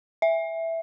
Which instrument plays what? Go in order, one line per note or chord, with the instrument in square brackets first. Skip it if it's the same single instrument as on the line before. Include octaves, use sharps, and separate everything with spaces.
[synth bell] E5